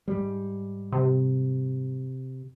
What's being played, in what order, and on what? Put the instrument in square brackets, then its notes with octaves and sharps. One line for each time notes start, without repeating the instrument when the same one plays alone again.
[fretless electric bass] G#2 G3
[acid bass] C3